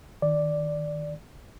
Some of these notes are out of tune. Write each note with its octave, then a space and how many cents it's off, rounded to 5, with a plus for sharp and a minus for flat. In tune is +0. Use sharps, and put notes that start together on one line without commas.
D#3 +0 D5 +0